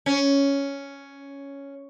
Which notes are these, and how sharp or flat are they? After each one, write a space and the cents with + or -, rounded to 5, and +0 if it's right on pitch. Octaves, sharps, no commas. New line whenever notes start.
C#4 +5